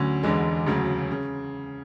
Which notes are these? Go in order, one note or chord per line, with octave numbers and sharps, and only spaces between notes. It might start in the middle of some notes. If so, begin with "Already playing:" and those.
Already playing: D2 D3 F#3 C#4
E1 E2 D3 G#3
E1 D2 C#3 F#3
C#3